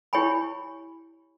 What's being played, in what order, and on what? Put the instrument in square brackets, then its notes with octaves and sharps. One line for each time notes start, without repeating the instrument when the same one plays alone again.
[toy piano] E4 G4 C#5 G#5 B5